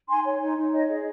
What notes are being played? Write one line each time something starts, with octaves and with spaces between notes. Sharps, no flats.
D#4 G#5 C6
C#5
D#4 C#5
D#4
C#5 D#5
G#4